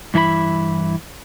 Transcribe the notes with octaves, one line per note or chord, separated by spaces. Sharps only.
G2 E3 E4 A4 B5